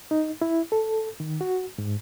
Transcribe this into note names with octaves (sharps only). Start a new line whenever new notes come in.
D#4
E4
A4
D#3
F#4
G#2